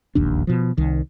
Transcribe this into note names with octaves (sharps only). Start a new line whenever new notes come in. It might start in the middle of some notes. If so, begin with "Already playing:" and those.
E1 A#1 D#2 D4
B2 F3
C2 D#3